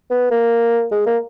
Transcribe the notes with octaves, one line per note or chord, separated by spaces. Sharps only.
B3
A#3
G#3
A#3